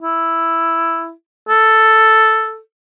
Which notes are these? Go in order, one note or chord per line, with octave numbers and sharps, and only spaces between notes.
E4
A4